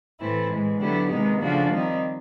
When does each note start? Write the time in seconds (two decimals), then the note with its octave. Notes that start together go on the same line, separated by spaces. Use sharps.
0.20 A2 E3 A3 C4 E4
0.50 A2 E3 G#3
0.80 D3 F#3 B3 E4 G4
1.10 C3 D#3 G#3 B3 D#4
1.40 C#3 F3 A3 D4 F#4
1.69 D#3 G3 C4 D#4